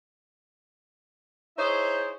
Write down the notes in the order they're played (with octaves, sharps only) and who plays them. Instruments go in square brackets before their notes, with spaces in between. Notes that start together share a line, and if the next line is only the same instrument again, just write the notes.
[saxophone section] D#4 E4 G#4 C5 C#5 E5